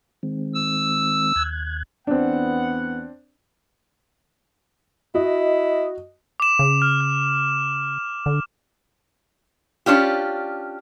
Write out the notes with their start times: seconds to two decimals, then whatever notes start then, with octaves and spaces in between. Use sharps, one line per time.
0.23 D#3 G#3 C4
0.54 E6
1.36 D#2 F#6 G#6
2.07 E2 B3 C4 D4 F#5
5.15 E4 F#4 D#5
6.40 D6 E7
6.59 C#3
6.82 F6
7.01 F6
8.26 D3
9.86 C#4 D4 F4 G4